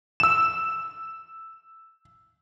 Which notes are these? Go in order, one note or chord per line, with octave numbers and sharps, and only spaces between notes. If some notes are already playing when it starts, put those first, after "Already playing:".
E6 E7